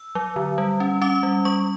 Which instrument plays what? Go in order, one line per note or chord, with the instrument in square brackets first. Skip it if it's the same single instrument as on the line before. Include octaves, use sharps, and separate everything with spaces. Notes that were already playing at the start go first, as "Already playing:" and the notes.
Already playing: [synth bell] E6
F#3
D3
G3
C#4
C#4 D6
G3
G3 C#6